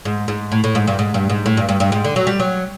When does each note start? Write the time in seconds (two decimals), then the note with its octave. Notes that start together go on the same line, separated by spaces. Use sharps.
0.05 G#2
0.28 G#2
0.52 A2
0.64 A2
0.75 G#2
0.87 G2
0.99 G#2
1.14 G2
1.30 G#2
1.46 A2
1.57 G2
1.69 G2
1.80 G2
1.92 G#2
2.05 D3
2.16 F#3
2.27 G3
2.40 F#3